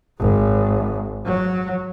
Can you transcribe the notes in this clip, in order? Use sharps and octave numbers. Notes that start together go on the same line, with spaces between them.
G#1
F#3